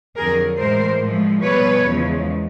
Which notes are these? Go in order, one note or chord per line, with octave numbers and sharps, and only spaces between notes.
F2 D3 F#3 G#4 A#4
A2 E3 G#3 A#4 C5
A2 F3 G#3
B2 G3 B4 C#5
E2 C#3 F3 G#3